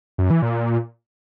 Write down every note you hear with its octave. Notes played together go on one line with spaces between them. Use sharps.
F#2
E3
A#2